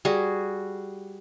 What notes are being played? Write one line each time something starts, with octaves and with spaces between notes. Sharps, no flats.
G3 F#4 G#4